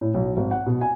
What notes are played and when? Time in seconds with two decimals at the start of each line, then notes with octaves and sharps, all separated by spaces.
0.01 A2
0.14 B1
0.37 G#1
0.51 F#5
0.66 B2
0.81 G#5